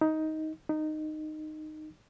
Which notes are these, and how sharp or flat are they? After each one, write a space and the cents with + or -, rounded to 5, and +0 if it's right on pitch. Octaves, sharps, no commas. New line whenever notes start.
D#4 +10
D#4 -15